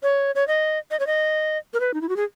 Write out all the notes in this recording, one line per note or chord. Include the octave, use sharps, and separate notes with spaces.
C#5
C#5
D#5
D#5
C#5
D#5
A#4
B4
D#4
E4
F#4
G#4